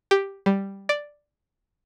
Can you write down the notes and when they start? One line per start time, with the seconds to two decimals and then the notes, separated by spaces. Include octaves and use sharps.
0.11 G4
0.46 G3
0.89 D5